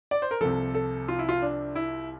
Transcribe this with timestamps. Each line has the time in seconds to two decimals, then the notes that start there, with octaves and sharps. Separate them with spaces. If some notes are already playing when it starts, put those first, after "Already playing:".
0.11 D5
0.22 C5
0.31 A#4
0.41 C2 C3 F3 A4
0.75 A4
1.08 F4
1.19 E4
1.29 F4
1.42 D4
1.75 E4